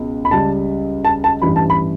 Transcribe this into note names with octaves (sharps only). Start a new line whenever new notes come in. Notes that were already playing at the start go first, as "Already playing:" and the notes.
Already playing: C#2 B2
B5
C#2 C#3 G3 A5
A5
A5
A1 G2 E3 G3 B5
A5
B5